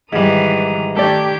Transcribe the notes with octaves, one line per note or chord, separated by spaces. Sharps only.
G#2 D#3 E3 G3 A#5 D#6
D#3 A3 G4 D5 G6 G#6